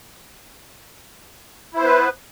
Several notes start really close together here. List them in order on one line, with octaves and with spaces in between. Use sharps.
E4 C5 B3 B4